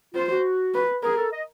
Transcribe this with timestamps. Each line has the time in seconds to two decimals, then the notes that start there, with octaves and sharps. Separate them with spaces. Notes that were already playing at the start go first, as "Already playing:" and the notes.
0.15 F4 C5
0.30 F#4
0.74 B4
1.03 G#4 A#4
1.17 A4
1.32 D#5